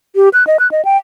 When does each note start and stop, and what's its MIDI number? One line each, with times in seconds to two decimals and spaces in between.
0.16 0.29 67
0.33 0.46 90
0.47 0.57 75
0.59 0.70 90
0.72 0.84 75
0.85 0.97 79